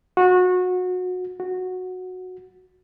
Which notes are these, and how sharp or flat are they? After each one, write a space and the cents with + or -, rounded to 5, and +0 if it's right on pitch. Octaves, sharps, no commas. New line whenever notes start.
F#4 -25
F#4 -10